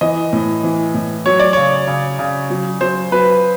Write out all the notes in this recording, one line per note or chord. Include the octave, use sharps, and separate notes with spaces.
E3 D#5
A2
E3
A2
F#3 C#5
D5
C#3 C#5
C#3
C#3
F#3
F#3 C5
F#3 B4